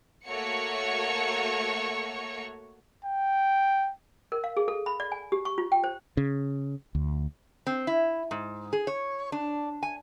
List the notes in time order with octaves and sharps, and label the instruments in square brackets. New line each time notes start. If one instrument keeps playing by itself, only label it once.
[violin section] A3 A#3 F#4 C#5 C#6 C#7
[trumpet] G5
[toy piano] A#4
F5
G#4
A4
B5
D5
G#5
G4
C#6
F4
G5
C5
[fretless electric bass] C#3
D2
[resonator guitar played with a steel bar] C4
E4
G#2
G#4
C#5
D4
G#5